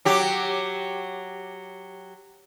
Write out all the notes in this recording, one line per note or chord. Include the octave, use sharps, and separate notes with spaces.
F#3 G4